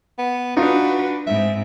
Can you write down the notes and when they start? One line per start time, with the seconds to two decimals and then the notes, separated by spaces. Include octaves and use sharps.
0.19 B3
0.57 D4 D#4 F4 F#4 B4
1.27 G#2 C4 E5